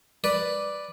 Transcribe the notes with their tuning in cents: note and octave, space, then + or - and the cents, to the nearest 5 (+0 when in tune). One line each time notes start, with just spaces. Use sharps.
B4 +0 D5 +0